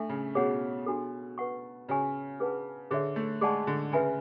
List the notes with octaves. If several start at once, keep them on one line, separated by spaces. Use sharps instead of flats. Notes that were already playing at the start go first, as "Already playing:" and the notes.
Already playing: A3 D4 A4 E5
C#3
B2 G#4 C#5 F#5
D4 F#4 A4
B4 F#5 C#6
C#3 F#4 C#5 G#5 C#6
D4 G#4 B4 F#5 A5
D3 G#4 C#5 E5
A3
G#3 G#4 D5 F#5 A5 C#6
D3
C#3 B4 E5 G#5 B5